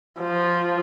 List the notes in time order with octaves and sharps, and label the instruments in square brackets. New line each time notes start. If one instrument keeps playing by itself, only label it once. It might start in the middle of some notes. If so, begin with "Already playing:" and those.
[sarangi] F3